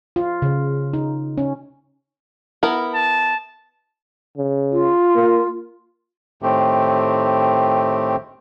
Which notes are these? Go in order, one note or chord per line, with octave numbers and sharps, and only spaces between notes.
F4
C#3
D#4
C#4
B3 E4 A#4
A5
C#3
F4
A#3
A2 D#3 A3 C4 G4